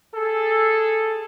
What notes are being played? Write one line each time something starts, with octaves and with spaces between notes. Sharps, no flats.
G#4 A4